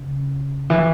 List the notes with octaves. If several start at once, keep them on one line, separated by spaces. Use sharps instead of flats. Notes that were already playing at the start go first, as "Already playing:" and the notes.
Already playing: C#3
E3